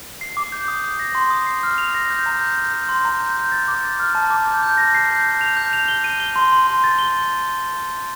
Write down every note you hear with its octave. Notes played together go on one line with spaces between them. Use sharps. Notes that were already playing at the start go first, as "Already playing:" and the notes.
C7
D6
G6
D#6
D#6
A#6
C6
D#6
C7
F6
F7
A#6
G6
A#5
G6
G6
G6
C6
A#5
G6
G6
A6
D6
A6
F6
A5
D6
G6
G6
A#6
C7
G6
G6
F7
G6
F7
G7
D#7
G7
C6
C6
C6
A6
G7